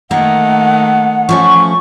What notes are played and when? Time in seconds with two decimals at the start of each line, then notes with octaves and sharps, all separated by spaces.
0.11 D#3 A3 A#3 F#5
1.29 F3 A3 C#4 C#6